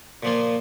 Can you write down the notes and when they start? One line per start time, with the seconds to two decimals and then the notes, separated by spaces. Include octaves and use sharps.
0.23 A#2 F3 A#3 F4